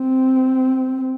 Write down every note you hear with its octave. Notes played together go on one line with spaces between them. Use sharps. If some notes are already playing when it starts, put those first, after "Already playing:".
Already playing: C4